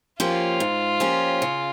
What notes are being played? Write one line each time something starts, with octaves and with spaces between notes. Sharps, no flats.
F3 A#3 C#4 F4 G4
G#2
F3 A#3 C#4 G4
C#3